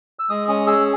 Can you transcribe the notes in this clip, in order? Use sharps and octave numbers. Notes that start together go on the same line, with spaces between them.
E6
G#3 D#6
C#4 D#6
G#4 E6